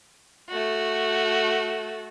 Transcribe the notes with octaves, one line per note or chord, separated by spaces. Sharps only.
A3 F#4